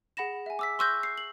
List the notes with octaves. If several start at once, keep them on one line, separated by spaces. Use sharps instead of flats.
G#4 F#5 B5 A#6 E7
E5 G#5
D6 E6 B6
C6 C#6 E6 F#6 G6 A#6
C7
F#7